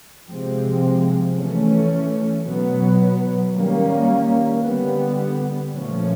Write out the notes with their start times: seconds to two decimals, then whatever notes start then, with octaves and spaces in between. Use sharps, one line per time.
0.29 C3 F3 G#3 C4
1.36 E3 A3 C#4
2.45 B2 F#3 B3
3.53 D#3 G3 A#3 C#4
4.62 D3 G3 B3
5.70 A#2 F3 A3 C#4